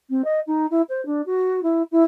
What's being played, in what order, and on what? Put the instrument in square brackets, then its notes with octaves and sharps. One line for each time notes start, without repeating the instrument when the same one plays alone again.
[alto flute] C4
D#5
D#4
E4
C5
D4
F#4
E4
E4